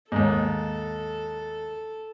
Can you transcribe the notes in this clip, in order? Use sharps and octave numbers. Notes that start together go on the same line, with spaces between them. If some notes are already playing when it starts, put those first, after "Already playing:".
D#2 G#2 A4